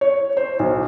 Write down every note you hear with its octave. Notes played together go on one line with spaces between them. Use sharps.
C#5
C5
B1